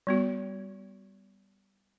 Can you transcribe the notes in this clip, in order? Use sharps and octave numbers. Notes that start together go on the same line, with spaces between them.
G3 B3 F#4